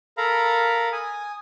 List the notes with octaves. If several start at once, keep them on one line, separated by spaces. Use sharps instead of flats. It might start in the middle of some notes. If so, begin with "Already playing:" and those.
A4 A#4 F5 A#5 B5
G#5 D#6